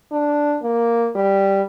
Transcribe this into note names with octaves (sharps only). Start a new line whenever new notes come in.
D4
A#3
G3